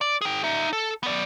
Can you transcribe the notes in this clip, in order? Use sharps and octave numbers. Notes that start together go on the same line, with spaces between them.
D5
G#4 G5
D#4 E5
A4
B3 D5